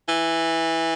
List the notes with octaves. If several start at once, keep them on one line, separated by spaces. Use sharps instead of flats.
E3